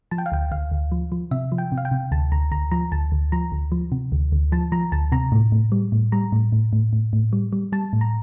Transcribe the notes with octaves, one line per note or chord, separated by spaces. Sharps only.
F3 A5
G5
F5
D2 G5
D2 F5
D2
F3
F3
C3 E5
F3
G5
C3
F5
G5
C3
D2 A5
D2 A#5
D2 A#5
F3 A#5
D2 A5
D2
F3 A#5
D2
F3
C3
D2
D2
F3 A5
F3 A#5
D2 A5
C3 A#5
A2
A2
G3
A2
G3 A#5
A2
A2
A2
A2
A2
G3
G3
G3 A5
A2
A#5